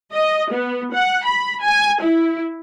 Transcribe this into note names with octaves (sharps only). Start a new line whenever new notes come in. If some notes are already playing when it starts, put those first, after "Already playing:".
D#5
B3
F#5
B5
G#5
E4